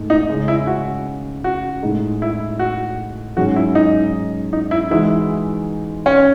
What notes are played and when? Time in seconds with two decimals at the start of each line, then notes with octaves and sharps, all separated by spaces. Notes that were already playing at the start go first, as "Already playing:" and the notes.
Already playing: G#2 A3
0.10 D#4
0.28 C#3 G#3 C#4
0.48 E4
0.67 F#4
1.44 F#4
1.82 A2 G#3 D#4 G#4
2.22 E4
2.59 F#4
3.36 G#2 F#3 C#4 F#4 G#4
3.56 E4
3.75 D#4
4.53 D#4
4.71 E4
4.91 E3 G#3 D#4 E4 F#4
6.06 C#4